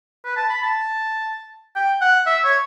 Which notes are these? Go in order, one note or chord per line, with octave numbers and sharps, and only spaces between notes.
B4
A5
B5
A5
G5
F#5
E5
C#5